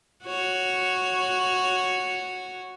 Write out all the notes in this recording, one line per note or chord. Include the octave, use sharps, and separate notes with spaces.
F#4 C#5